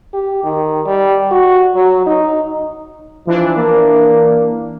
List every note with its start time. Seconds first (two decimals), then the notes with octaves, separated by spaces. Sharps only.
0.14 G4
0.44 D#3
0.86 G3
1.31 F#4
1.75 F#3
2.06 D#4
3.27 E3 F3 D4
3.58 A#3